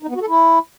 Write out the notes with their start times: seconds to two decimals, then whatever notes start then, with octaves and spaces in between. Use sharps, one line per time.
0.03 D#4
0.09 B3
0.15 F#4
0.22 A4
0.28 E4